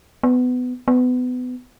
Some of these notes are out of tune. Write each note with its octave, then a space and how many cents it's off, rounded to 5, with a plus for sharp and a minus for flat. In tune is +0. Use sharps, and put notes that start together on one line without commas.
B3 +20
B3 +25